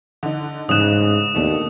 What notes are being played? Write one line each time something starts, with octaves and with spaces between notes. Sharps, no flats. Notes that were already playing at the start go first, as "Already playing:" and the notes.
D3 D#4
A1 G#2 C#3 D#6 F#6 E7
D#2 B2 A3 D4